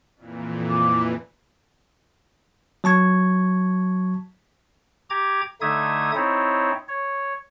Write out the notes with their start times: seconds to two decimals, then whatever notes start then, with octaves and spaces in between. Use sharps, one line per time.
0.16 F2 A#2 E3
0.70 D6
2.84 F#3 A5 C#6 G#6
5.10 G4 A#5 D6 G#6
5.61 D3 A3 D#4 E5 D#6 G#6
6.15 C4 D#4 E4 C#5
6.88 C#5